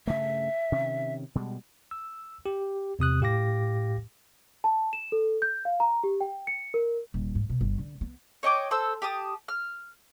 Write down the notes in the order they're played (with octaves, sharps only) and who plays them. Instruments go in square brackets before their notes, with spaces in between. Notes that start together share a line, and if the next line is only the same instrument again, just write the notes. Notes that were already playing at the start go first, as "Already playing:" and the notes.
[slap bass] G2 C#3 A3 [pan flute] E5
[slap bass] C3 D#3 C#4
B2 G3 G#3
[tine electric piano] E6
G4
E2 C3 D#6 F#6
A2 G4 F5 G5 D6 A#6
[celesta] A5
E7
A4
G6
F5
A#5
G4
G5
C#7
A#4
[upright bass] D#1
G#2
B2
G1
D3
B3
[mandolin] C#5 D#5 G5 D6
A4 C5 E6
G4 A5 D#6
F6